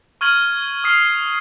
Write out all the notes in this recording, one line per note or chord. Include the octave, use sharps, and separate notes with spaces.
C#6 F6 G#6 D#7 F#7
D#6 F6 C7